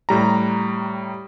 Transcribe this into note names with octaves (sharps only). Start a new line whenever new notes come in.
A2 G3 A#5